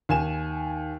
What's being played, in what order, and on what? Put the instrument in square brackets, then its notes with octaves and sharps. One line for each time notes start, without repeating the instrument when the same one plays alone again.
[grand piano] D#2 G#5 E7